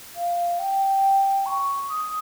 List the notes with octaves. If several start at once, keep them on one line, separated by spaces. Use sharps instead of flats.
F5
G5
C#6
D#6